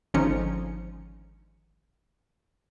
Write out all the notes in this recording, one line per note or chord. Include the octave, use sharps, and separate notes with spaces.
G#1 D3 F3 C#4 D#4 C#7